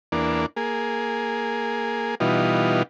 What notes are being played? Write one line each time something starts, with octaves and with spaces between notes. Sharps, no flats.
E2 A#3 D4
A#3 G#4
B2 E3 G3 D#4 F4